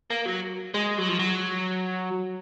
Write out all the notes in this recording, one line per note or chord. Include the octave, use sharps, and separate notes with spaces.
A#3
F#3
G#3
F#3
F3
F#3